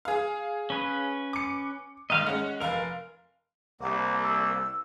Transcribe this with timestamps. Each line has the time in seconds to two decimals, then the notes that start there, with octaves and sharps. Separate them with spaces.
0.05 G#4 F5
0.70 C#4 B4
1.33 D6 C#7
2.10 G#2 D#3 D#5 F5 F6
2.26 G#3 C#4 F#5
2.60 F1 A#4 F5 F7
3.80 C2 A#3 F#5
4.23 E6